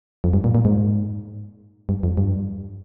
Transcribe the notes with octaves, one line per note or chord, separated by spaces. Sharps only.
F2
G2
A#2
A#2
G#2
G2
F2
G2